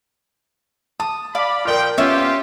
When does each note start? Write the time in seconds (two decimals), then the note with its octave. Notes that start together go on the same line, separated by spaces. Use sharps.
1.00 A5 D#6
1.35 D5 F5 B5
1.65 A#2 F3 A#4 D5 G5 F6
1.98 B3 C#4 F4 G4 C#5 E5